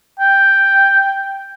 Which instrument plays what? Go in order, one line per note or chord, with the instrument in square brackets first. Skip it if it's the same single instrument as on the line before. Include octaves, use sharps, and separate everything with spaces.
[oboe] G5